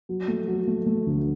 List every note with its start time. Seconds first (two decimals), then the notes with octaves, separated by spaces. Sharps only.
0.09 F#3
0.28 A3
0.47 F#3
0.67 A3
0.86 A3
1.06 D2